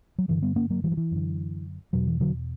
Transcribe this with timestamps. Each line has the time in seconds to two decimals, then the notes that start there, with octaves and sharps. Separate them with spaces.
0.18 F#3
0.28 G2 D3 E3
0.42 G3 B3
0.56 A#3 C#4
0.70 F#3 A#3
0.84 E3 G3
0.92 F#3
0.97 E3
1.11 F#2 D3
1.93 E2 B2 F#3
2.07 E3
2.20 D3 F#3